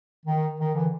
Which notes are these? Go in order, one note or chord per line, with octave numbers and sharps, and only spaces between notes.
D#3
D#3
D3 E3